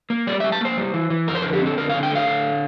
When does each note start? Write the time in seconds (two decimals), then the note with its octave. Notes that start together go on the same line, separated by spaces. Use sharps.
0.10 A#3
0.27 G3 D5
0.40 E5
0.44 G3
0.52 A5
0.61 A#3 C5
0.77 G3
0.94 E3
1.10 E3
1.27 F2 A#4
1.35 C5
1.42 D3 A#4
1.53 G4
1.61 C4 A4
1.77 D3 A#4
1.90 F5
1.94 D3
2.03 G5
2.11 A3 F5
2.27 D3